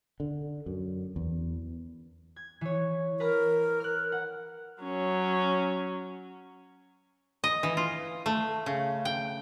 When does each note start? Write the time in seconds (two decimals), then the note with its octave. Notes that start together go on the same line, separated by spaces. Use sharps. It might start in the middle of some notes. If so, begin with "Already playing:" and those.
0.20 D3
0.66 F#2
1.16 E2
2.36 G#6
2.61 E3 C#5
3.20 A#4 B4 A#5 F6
3.80 F6 F#6
4.12 F#5
4.83 F#3 C#4
7.44 D#5
7.63 E3
7.77 F4
8.26 A3
8.66 C#3
9.05 G5